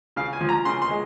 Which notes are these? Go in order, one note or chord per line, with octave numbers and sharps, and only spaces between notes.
C#3 F5
G#5
F3
A#5
C#3 C6
C6
G#3